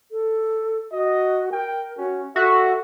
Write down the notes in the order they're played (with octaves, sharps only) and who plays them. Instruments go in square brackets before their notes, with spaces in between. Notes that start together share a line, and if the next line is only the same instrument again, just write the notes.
[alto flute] A4
[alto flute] F#4 [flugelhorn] D#5
[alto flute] A#4 [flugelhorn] G5
[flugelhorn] C#4 [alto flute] F#4
[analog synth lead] F#4 [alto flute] A4 [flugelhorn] E5